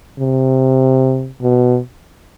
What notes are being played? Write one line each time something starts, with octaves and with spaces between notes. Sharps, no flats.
C3
B2